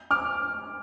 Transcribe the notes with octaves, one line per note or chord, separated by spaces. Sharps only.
D6 F6